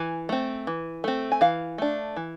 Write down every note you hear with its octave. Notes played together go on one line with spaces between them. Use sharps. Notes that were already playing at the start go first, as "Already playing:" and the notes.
Already playing: E3 G#5
A3 C4
E3
A3 C4
G#5
E3 F5
A3 D4
E3